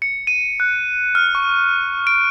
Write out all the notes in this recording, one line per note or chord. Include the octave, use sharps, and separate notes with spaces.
C#7
D#7
F#6
F6
C#6
D7